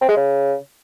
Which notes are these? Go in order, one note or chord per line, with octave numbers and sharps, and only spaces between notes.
C4
G#3
C#3